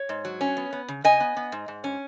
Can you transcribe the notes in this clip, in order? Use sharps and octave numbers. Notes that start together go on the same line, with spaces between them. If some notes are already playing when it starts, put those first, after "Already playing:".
Already playing: C#5
G#2
F#3
C#4
B3
B3
C#3
C#3 D#5 G#5
B3
B3
G#2
G#2
C#4